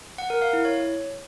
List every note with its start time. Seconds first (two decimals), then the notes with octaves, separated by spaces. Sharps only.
0.18 F#5
0.30 A#4
0.42 F5
0.53 E4
0.65 C#5